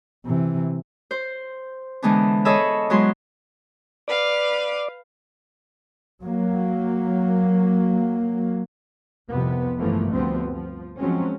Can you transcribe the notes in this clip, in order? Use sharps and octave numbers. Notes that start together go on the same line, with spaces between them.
C3 E3
C5
D3 E3 G#3 B3 D4
G#4 A4 C#5 D#5 B5 E6
F#3 G#3 B3 E4 C6
B4 D5 F5
F#3 A#3
C2 F2 C3 B3
G1 E3 F3 A3 A#3
D2 G2 F3 G3 B3 C4
F3
F3 F#3 G#3 C4 C#4